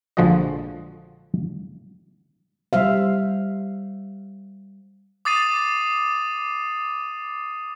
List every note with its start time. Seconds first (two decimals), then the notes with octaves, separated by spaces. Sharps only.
0.17 A#1 D3 F3 G#3 F#4 D#5
2.73 G3 C5 E5 F5
5.25 D6 D#6 A6 C7 D#7